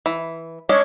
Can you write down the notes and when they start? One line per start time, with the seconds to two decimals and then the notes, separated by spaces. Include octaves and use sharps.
0.06 E3
0.69 G#3 C#4 D4 C#5